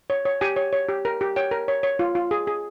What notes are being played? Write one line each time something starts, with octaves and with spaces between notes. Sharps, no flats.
C#5
C#5
G4 G#5
C#5
C#5
G4
A#4
G4
C#5 G5
A#4
C#5
C#5
F4
F4
G#4
G#4